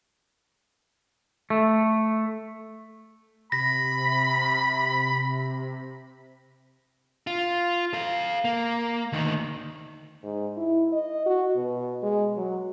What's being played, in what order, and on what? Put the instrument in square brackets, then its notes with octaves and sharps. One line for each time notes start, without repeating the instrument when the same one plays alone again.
[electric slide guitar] A3
[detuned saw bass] C3 [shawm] B5 [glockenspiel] A#6
[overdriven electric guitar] F4
A4 F5
A#3
D2 D#3
[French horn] G#2
E4
D#5
F#4
B2
G#3
F#3